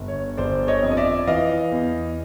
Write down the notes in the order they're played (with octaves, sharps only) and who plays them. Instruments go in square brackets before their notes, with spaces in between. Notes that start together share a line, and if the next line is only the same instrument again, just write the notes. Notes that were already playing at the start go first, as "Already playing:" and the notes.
Already playing: [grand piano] G1
C#5
G1 C5 D5
C#5 D#5
F2
D#5
D5 E5
E3 D#5 F5
E2